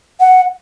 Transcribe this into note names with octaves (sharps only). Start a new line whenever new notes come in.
F#5